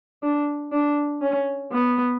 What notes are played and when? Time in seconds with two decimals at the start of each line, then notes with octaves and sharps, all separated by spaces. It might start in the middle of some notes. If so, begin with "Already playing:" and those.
0.23 D4
0.72 D4
1.21 C#4
1.72 B3